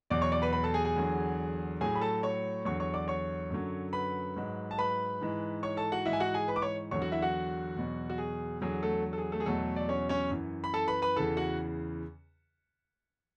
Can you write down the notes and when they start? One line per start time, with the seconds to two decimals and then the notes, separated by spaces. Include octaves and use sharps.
0.10 E2 B2 F#3 D5 D6
0.21 C#5 C#6
0.32 D5 D6
0.42 B4 B5
0.53 B4 B5
0.63 A4 A5
0.74 G#4 G#5
0.85 G#4 G#5
0.96 E2 D3 F#3
1.81 A2 F#3 G#4 G#5
1.96 B5
2.01 A4 A5
2.23 C#5 C#6
2.65 E2 D3 F#3 C#5 C#6
2.80 C#5 C#6
2.93 D5 D6
3.08 C#5 C#6
3.51 F#2 D3 F#3
3.93 B4 B5
4.36 G#2 F#3
4.71 A5
4.78 B4 B5
5.21 G#2 E3
5.63 C#5 C#6
5.77 A4 A5
5.92 F#4 F#5
6.06 G#2 E3 E4 E5
6.13 G#5
6.20 F#4 F#5
6.34 G#4 G#5
6.48 B4 B5
6.56 D6
6.62 C#5 C#6
6.91 E2 D3 F#3 C#5 C#6
7.02 F#4 F#5
7.12 E4 E5
7.22 F#4 F#5
7.76 E2 B2 F#3
8.10 F#4
8.18 G#4
8.61 E2 D3 F#3 G#4
8.83 A3 A4
9.13 A4
9.18 G#4
9.32 A3 A4
9.40 G#4
9.46 E2 B2 F#3 A3 A4
9.76 D5
9.89 C#4 C#5
10.09 C#4 C#5
10.31 F#2 E3
10.64 B5
10.74 A4 A5
10.88 B4 B5
11.02 B4 B5
11.16 E2 C#3 E3 A4 A5
11.37 F#4 F#5